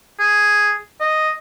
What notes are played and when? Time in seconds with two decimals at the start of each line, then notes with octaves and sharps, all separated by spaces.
0.19 G#4
1.00 D#5